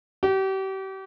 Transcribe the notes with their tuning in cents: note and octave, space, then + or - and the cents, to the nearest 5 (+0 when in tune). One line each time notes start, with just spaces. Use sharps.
G4 -35